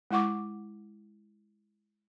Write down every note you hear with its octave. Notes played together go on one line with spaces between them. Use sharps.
G#3 E4 F#5 C#6 D6